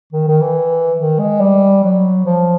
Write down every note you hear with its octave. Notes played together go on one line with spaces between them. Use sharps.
D#3
D#3
E3
D#3
G#3
G3
F#3
F3